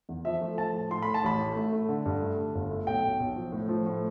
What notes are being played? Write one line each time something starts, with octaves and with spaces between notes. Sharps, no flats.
E2
F3 E5
A3
F3 A5
A2
A2 C6
A2 B5
A5
A1 B5
A2
A3
A3
D3
G2
A3
D3
G1
A3
B1 G5
B1
B1
F3
A2
F3
A2